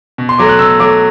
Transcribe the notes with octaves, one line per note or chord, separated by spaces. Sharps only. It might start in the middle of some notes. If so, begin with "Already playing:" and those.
B2
C6
F#3 A3 D6
F#6
B2 E6
F#3 A3 D6